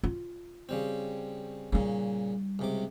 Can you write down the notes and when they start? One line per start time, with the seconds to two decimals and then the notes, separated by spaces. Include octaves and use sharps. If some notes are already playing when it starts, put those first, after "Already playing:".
0.04 F4
0.69 C#3 G3 C4
1.73 A#2 C#3 G3 D#4
2.59 C#2 C3 D6